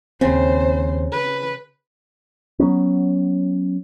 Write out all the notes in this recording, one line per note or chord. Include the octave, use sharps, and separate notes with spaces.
D#2 C#3 C4 C5
B4
F#3 B3 C#4